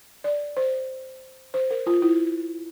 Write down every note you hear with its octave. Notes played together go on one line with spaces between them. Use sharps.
D5
C5
C5
A#4
F4
E4